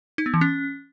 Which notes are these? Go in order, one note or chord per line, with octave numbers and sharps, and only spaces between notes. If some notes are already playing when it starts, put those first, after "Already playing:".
D#4
B3
E3
C#4